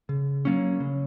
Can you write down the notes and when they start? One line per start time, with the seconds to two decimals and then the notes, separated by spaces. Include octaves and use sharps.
0.09 C#3
0.45 F#3 A#3 C#4
0.80 C#3